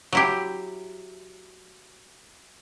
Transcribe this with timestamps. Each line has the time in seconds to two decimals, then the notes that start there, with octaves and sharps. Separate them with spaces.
0.13 F#3 E4 G4